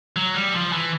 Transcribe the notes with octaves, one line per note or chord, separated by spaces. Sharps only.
F#3
G3
F3
E3